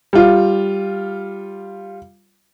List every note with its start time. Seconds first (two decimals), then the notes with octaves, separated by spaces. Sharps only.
0.13 G3 F4